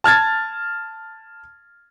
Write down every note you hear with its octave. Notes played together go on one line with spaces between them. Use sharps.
A5 F6 G#6 A6